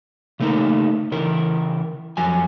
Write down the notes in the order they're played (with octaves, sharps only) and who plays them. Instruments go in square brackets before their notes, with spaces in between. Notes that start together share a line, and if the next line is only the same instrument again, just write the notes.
[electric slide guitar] C#3 A3 A#3 D#4 A#4
C#3 E3 A#4
F2 F#3 G#5